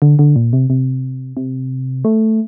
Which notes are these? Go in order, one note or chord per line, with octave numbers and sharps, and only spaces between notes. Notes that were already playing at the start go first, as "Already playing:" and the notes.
D3
D3
A#2
C3
C3
C3
A3